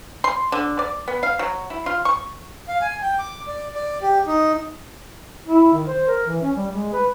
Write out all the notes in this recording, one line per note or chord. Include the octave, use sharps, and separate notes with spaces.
C6
D3
D5
B3
F5
F#3
E4
F4
C#6
F5
G#5
G5
D6
D5
D5
G4
D#4
E4
D#3
C5
A#4
E3
C#4
G3
G#3
B4